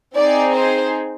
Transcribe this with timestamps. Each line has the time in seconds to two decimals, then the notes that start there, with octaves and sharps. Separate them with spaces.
0.16 C4 D#4 G#4 D5
0.55 C5